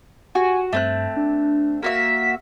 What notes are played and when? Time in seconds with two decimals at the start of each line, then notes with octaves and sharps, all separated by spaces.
0.35 F#4 G#5
0.73 G2 A3 C4 F#6
1.16 D4
1.83 A#3 F#4 E5 B6